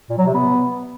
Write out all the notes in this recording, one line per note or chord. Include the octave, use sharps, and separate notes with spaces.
A#2
F#3
C3
B3